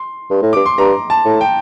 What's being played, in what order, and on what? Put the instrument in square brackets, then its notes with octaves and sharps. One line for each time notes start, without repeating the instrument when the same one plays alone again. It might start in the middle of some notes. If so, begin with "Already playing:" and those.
Already playing: [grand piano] C6
[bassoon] G2
A2
[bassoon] G2 [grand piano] D6
[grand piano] C6
[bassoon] G2 [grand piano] A#5
[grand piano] A5
[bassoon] A2
[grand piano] G5